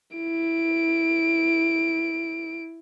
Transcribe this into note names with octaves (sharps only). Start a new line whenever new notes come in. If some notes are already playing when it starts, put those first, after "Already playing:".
E4 D7